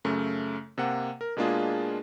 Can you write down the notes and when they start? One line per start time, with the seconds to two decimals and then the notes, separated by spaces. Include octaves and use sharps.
0.05 F#2 C#3 A3
0.78 C3 A#3 F#5
1.21 A#4
1.37 B2 G#3 A#3 D4 F4 G#4